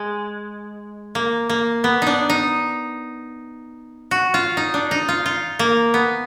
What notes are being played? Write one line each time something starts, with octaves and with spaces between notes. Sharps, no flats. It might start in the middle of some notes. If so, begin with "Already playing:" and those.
Already playing: G#3
A#3
A#3
B3
D4 D#4
D#4
F#4
F4
D#4
D4
D#4
F4
F4
A#3
B3